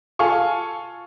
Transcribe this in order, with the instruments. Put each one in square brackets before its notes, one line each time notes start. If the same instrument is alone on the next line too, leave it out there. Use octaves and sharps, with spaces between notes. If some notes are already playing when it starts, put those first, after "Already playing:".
[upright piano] F4 A4 F5 G#5 C#6